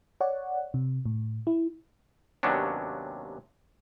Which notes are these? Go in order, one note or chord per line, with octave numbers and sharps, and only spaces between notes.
C#5 D5 F#5
C3
A2
E4
D#2 C3 F#3 B3 C#4 D4